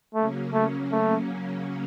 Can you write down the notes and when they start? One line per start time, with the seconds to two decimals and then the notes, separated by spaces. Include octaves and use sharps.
0.15 C#3 F#3 A3 A#3 C#4
0.53 A3
0.92 A3